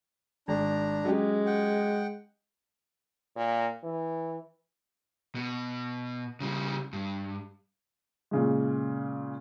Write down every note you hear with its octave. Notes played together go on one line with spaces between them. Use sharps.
G#1 D4 A#5
F#3 G#3 C#4 G4
F#5 G5
A#2
E3
B2
C#3 G3
G2
A#2 C#3 G#3